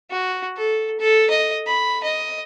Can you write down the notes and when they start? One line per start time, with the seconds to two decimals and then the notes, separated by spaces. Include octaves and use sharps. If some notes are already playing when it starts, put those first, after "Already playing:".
0.11 F#4
0.57 A4
0.99 A4
1.30 D#5
1.66 B5
2.03 D#5